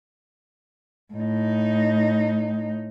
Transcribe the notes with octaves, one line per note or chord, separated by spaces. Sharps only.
A2 D#4